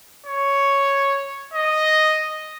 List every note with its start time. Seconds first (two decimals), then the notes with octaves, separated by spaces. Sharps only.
0.26 C#5
1.54 D#5